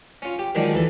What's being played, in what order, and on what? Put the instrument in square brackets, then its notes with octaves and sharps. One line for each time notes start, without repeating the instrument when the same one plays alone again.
[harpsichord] C#4 F4
G4
D#3 F3 F#3 G#3 D4 D#4
D2 E3 A4